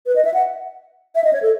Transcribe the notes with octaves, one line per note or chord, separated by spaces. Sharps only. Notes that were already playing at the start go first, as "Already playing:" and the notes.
B4
D#5
E5
F#5
E5
D#5
C#5
A4